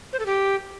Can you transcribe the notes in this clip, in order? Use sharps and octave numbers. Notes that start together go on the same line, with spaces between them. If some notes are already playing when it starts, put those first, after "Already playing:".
C5
A4
G4